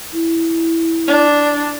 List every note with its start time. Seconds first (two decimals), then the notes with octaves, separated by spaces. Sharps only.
0.13 E4
1.08 D4